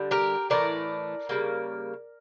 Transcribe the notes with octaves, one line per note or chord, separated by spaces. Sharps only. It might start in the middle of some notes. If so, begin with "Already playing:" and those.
Already playing: D3 G3
G4 A#4
A2 E3 A3 A#4 D5
C#3 G3 A#3